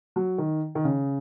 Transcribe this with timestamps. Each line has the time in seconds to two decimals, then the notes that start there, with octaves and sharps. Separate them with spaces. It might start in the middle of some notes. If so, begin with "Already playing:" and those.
0.16 F#3
0.38 D#3
0.75 D#3
0.84 C#3